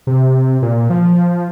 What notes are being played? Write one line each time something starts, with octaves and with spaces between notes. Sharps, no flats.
C3
A#2
F3